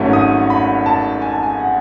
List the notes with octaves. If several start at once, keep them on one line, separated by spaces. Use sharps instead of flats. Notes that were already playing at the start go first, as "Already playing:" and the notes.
Already playing: G#1 G#2 F#3 A3 C#4
D#6
B5
A5
G#5
A5
G#5
F#5